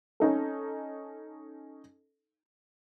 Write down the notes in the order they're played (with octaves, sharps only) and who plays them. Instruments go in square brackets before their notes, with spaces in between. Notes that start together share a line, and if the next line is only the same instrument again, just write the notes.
[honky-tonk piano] C#4 D#4 A4